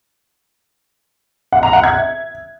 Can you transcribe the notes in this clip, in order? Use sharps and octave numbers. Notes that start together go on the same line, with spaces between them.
F#5
A#5
F#5
G#6
E5